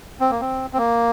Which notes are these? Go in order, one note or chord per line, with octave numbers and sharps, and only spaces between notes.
C4
A#3
C4
C4
A#3